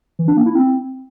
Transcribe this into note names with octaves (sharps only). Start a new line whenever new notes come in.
E3
D4
A#3
E4
C4